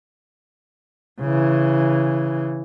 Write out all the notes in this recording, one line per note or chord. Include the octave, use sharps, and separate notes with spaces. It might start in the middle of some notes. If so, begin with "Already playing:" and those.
C#3 E3